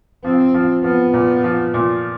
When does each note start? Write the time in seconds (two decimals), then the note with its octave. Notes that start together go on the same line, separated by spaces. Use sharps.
0.24 F3 C4
0.54 F3
0.84 F3 B3
1.14 A#2
1.44 F3
1.74 A#2